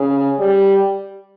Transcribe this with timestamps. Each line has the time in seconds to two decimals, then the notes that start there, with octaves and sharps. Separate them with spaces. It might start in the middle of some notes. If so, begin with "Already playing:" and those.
Already playing: C#3
0.39 G3